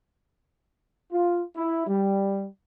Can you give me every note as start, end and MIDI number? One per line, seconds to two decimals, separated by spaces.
1.12 1.42 65
1.56 1.83 64
1.87 2.47 55